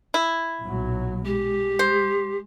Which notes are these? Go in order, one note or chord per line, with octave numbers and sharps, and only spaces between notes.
E4
B1 A#2 F#3
G#3 G4
C5